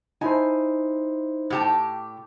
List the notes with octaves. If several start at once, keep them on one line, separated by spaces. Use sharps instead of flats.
D#4 E4 C5 G#5
A2 G4 A5